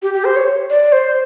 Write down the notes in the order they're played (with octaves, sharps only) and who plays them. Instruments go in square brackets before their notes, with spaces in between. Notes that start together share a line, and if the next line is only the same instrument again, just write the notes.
[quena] G4
G4
C5
C#5
D5
C5